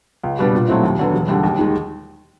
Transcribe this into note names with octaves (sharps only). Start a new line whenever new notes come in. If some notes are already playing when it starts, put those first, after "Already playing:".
C#2
B2 G3 B3 D4
A#2
F#3 A3 C4 E4
D#2
D3 F#3 B3
E1
D#2 D3 G3
D#2
D#3 G#3